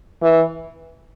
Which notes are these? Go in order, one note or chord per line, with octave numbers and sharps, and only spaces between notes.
E3